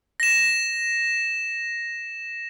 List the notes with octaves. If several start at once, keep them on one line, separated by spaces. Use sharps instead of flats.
A#6 E7